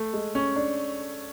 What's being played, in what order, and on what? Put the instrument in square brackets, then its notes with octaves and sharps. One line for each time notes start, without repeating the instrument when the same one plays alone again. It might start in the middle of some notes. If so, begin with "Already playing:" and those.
Already playing: [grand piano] A3
G#3
C#4
D4